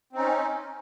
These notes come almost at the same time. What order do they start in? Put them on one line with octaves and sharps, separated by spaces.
C4 D#4 C#4